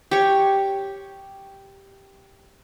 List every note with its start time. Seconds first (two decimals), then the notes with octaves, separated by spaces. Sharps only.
0.11 G4 C#5